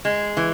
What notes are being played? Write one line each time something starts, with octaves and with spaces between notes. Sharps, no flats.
G#3
E3